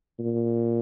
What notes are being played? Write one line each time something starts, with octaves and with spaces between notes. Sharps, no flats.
A#2